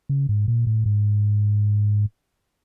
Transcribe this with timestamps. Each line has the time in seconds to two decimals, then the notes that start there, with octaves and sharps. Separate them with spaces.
0.09 C#3
0.29 G#2
0.48 A#2
0.67 A2
0.86 G#2